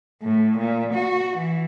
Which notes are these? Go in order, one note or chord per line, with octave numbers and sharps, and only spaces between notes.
A2
A#2
F#4
E3